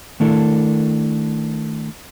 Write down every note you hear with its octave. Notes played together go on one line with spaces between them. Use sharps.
D#3 A3 D4 E4 A4 A#4